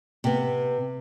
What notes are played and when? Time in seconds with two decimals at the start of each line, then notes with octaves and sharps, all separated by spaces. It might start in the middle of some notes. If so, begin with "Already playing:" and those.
0.24 C3 B3